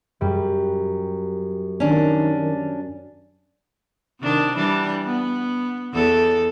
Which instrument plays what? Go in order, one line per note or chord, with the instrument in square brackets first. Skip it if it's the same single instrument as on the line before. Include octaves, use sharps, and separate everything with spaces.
[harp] F#2 G3
[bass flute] D#3 [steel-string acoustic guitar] C#4 D4
[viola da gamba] C3 D#3 D4
E3 G3 D4
B3
E2 A4